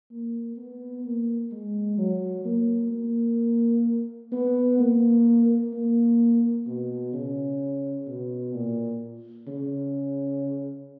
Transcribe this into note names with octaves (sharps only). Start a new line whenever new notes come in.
A#3
B3
A#3
G#3
F#3
A#3
A#3
B3
A#3
A#3
B2
C#3
B2
A#2
C#3